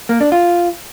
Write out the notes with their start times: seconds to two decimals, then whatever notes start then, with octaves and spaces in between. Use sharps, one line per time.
0.09 A#3
0.21 D4
0.32 F4